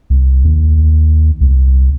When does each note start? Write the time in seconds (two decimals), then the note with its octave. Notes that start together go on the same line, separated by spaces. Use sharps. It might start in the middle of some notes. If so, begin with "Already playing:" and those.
0.10 C2
0.45 D#2
1.41 C2